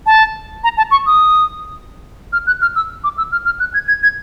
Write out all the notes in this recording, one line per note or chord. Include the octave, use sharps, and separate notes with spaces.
A5
A#5
A5
C#6
D#6
F6
F#6
F6
E6
D6
E6
F6
F6
F#6
G#6
G#6
G#6